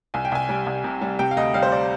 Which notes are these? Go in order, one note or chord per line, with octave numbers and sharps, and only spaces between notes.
C2 G#5
G5
C2 G#5
G3
C2
C3
G3
C3 G5
F5
D2 D#5
G3 F5
C5
D5